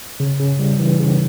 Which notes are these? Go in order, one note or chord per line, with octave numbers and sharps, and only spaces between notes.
C#3
C#3
G3
E3
C#3